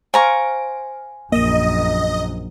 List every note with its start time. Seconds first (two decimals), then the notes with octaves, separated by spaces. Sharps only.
0.14 C5 F5 G#5 A#5 C#6 D7
1.32 A#1 F#2 A#3 D#5 D#6